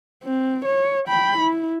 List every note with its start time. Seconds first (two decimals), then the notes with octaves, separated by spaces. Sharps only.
0.24 C4
0.65 C#5
1.08 G5 B5
1.38 E4